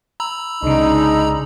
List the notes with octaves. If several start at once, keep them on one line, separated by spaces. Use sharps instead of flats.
A#5 B5 E6
C2 C#3 G#3 D4 D#4